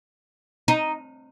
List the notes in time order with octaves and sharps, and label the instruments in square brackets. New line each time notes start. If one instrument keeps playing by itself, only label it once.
[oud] D#4